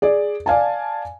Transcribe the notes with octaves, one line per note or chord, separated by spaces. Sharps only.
G#4 D5
D5 F5 G#5 A5